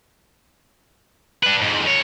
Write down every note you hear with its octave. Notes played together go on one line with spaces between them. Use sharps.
D4 B4
F2 G#2
F2 C#5